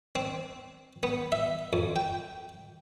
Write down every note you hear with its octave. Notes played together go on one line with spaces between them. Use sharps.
C4
B3
E5
F2
G5